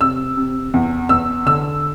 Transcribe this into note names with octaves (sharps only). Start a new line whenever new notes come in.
C3 E6
C3
E2
E2 E6
D3 E6